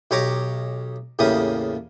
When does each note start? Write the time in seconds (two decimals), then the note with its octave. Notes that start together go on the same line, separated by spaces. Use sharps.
0.11 B1 G4 C#5 A#5 D6
1.19 E2 A2 C#3 A#3 G4 D#6